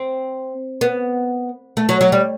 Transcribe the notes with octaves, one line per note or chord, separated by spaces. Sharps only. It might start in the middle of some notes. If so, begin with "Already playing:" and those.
Already playing: C4
B3
A3
F#3
F#3
G3